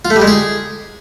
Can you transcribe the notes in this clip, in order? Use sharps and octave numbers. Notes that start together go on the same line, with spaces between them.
F4
A3
G3
G#3
G#4